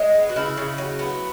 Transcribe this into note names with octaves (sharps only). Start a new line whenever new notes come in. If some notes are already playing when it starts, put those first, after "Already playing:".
Already playing: G#3
B3
F#4
C#3 E4
C#3
F#3
B3